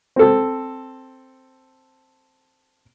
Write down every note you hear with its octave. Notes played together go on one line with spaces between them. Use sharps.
C4 A4